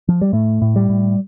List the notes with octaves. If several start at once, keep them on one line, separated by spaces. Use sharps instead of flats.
F3
G3
A2 A3
A2
G3
A2